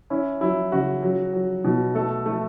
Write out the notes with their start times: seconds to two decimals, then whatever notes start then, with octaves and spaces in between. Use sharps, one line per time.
0.10 C#4 E4
0.41 F#3 E4
0.72 C#3 F#4
1.03 F#3
1.33 F#3
1.64 B2
1.94 A3 A4
2.26 A3